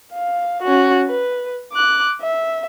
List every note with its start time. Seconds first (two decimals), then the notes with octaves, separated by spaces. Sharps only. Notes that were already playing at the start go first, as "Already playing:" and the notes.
0.13 F5
0.62 C#4 F#4
1.07 B4
1.72 D6 F#6
2.22 E5